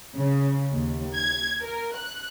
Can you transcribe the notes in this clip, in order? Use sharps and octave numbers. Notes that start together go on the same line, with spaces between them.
C#3
D#2
G#6
A#4
F#6